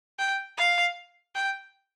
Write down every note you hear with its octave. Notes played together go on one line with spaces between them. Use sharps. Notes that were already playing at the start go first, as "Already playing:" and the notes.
G5
F5
G5